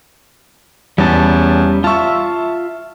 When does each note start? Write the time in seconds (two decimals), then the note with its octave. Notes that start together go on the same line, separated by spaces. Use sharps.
0.98 E2 G3 C#4 A5
1.84 F4 E5 A5 C#6